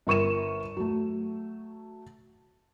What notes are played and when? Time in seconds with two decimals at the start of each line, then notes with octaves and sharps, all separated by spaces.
0.07 G1 A#4 C#6 D#7 E7
0.77 F#3 A3